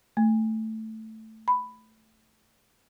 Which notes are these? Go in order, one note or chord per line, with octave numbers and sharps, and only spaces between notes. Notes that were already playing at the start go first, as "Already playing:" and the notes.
A3
B5